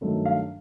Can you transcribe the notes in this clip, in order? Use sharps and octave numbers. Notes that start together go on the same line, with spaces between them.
G2 D#3 F#3 A3
F5